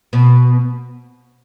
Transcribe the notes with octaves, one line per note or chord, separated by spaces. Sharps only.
B2